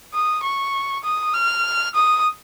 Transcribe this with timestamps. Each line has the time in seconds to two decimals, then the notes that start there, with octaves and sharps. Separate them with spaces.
0.14 D#6
0.43 C#6
1.04 D#6
1.34 F6
1.95 D#6